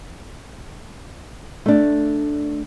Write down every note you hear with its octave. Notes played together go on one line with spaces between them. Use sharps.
A3 D4